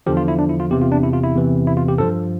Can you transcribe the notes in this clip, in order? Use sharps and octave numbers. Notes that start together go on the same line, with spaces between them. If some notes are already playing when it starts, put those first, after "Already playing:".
E2 D3 F3 G4
F4
E4
D4
E4
F4
E2 C3 E3 G4
F4
D4
E4
F4
E4
E2 C3 E3
E4
F4
G4
G2 F3 A4